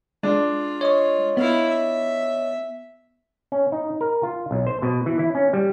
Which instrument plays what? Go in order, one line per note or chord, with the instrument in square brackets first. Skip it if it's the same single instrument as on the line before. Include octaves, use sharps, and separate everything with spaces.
[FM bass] G#3 [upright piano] D4 [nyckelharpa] F4
[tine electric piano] C#5 D#5 C#6
[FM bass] B3 [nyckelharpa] E4 F5
[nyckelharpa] E5
[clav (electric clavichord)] C#4
D#4
A#4
F4
B1
C5
B2
E3
E4
C#4
G3